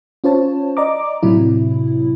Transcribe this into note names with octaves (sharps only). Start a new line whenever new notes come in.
C#4 F4 C5 C#5 A5
D5 D#5 A#5 D6
A2 C3 F#3 E4